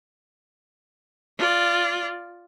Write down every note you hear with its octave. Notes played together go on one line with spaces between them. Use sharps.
F4 D5